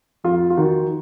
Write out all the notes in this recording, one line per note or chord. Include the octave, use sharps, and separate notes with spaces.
F2 F4
F4
D#3 F#4